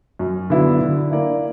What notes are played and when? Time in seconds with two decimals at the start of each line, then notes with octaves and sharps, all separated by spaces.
0.19 F#2
0.50 D3 F#3 B3 E4
0.81 D3
1.11 A#3 E4 A#4 D5